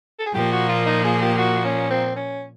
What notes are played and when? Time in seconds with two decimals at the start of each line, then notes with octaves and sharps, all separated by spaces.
0.19 A4
0.26 G#4
0.34 A#2 F3 A#3 G4
0.52 F#4
0.69 F4
0.86 D#4
1.04 G#4
1.22 G4
1.38 F#4
1.65 C#4
1.91 C4
2.16 C#4